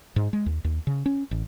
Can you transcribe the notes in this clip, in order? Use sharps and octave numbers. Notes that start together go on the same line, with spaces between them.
G#2
G#3
D#2
D#2
C#3
C#4
A1